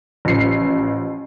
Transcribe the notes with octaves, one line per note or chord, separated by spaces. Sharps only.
A1 F3 C7